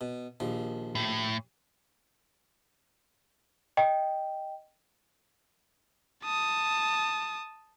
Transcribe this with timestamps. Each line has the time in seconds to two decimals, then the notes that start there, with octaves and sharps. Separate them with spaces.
0.01 B2
0.40 A#1 D#2 F3
0.95 A2
3.77 D#5 G5
6.24 A5 D#6